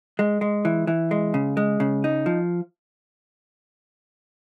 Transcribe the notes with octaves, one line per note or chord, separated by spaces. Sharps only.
G#3
G#3
E3
E3
G#3
C#3
G#3
C#3
D#4
F3